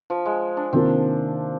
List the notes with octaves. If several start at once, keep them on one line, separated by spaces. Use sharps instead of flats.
F3
G#3
D4
C3 D#3 A#3 C4 F4 A#4